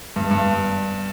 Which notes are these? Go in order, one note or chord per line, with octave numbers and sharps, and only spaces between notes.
G2
G2